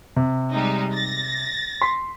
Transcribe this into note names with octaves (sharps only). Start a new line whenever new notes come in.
C3
G3 G#3 D#4
A6 A#6
C6 B6